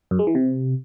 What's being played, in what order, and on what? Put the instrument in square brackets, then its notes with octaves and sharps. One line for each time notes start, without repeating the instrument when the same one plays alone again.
[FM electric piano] F#2
G#3
E3
C3